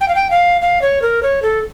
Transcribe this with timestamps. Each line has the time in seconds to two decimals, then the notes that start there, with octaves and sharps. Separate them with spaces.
0.01 G5
0.08 F5
0.15 G5
0.31 F5
0.62 F5
0.82 C#5
1.02 A#4
1.23 C#5
1.42 A4